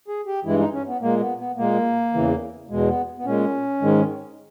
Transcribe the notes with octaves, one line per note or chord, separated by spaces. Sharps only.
G#4
G4
G2 E3 G#3 E4
D#4
C#4
B3
A#2 G#3 A#3
B3
B3
A#2 G#3 A#3
E2 C#3 E3
E2 B2 G#3
B3
B3
A#2 G#3 C#4
G#2 D#3 G#3